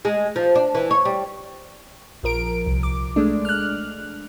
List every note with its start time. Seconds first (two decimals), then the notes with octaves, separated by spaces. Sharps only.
0.05 G#3
0.36 F3
0.55 D4
0.75 E3
0.91 C#5
1.05 G3
2.23 A#1 F3 A#4 D7
2.66 C2
2.83 D6
3.16 G#3 A3 D4
3.45 F6 F#6